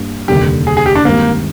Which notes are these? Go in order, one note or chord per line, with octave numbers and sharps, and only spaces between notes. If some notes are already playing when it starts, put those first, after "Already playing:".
Already playing: G2 A#3 D4
F1 D#2 D3 G3 G4
G#4
G#4
G4
D4
G2 D#3 G#3 A#3 C4 G4